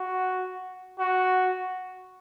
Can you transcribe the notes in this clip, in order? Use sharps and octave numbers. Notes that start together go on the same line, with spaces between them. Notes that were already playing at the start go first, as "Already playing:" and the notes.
Already playing: F#4
F#4